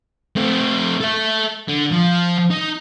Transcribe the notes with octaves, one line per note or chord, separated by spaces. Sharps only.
A3 C4
A4 E5
D3
F3
D#4